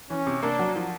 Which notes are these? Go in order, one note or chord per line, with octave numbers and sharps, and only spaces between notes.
E3 C#4
C3
A#3 D4
F#3
F3